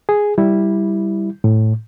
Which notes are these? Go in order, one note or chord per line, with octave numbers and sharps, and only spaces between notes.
G#4
G3 E4
A2